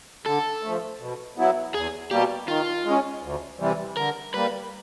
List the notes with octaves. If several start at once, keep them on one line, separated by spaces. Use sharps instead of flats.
D3 A4
F3 A3
B2
F#3 B3 E4
E2 G#4
B2 G3 A#3 G4
D#3 F4
G#3
C#4
D2
C3 E3 G3
D3 A#4
G3 A#3 B4